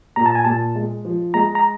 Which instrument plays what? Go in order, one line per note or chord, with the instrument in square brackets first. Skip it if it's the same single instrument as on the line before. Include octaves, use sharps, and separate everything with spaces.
[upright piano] A#2 [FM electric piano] A#5
[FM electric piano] A5
G#5
[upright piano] A#2 [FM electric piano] A5
[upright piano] G#3
F3
[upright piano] G#3 [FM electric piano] A#5
[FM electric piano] A#5